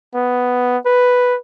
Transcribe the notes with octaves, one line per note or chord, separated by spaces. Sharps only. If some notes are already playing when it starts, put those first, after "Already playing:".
B3
B4